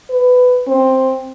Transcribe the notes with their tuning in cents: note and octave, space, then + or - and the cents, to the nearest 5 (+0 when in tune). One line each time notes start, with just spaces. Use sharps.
B4 +15
C4 +10